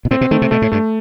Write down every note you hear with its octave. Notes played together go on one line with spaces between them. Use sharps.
B2
A2 C4
B2
D#3 A3
C3
B2 A3
A2
G2 A3